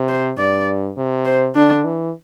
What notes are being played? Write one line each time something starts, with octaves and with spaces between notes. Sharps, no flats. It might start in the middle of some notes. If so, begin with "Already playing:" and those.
Already playing: C3
C5
G2 D5
C3
C5
D3 D4
E3